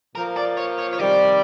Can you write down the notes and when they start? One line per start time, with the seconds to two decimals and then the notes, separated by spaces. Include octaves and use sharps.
0.15 A#2 F3 A#3 A#4
0.37 D5
0.57 C#5
0.79 C#5
0.93 C#5
0.99 C3 D#3 G3 C4 D5